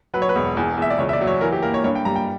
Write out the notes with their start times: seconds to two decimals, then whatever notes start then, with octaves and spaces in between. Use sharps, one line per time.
0.14 F#3 B4
0.22 C#5
0.29 B4
0.36 E1
0.57 E2
0.77 E2 E5
0.90 D5
0.98 C#2 C#5
1.09 E5
1.13 D5
1.21 F#3
1.27 C#5
1.41 E3 A#4
1.52 G4
1.63 A#3 A#4
1.74 C#5
1.84 G2 C#5
1.95 G5
2.05 G3 A#5
2.16 G5